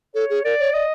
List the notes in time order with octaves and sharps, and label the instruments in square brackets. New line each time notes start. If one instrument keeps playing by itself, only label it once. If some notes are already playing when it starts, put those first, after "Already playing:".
[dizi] A4 [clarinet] C#5
[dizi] G#4
[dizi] A#4 [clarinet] D5
[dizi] C#5
[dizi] D5 [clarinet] D#5